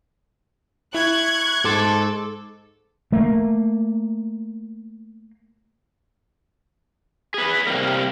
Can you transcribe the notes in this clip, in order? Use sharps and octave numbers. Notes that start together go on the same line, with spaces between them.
E4 C#6 F#6 G#6
G#2 A4 A5 C6 D6
A3 A#3
G#4 B4
C3 D#3 G3 A#3 A#4